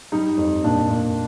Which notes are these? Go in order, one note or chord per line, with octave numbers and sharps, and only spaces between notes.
G3 D#4
F2
A#2 D4
A#2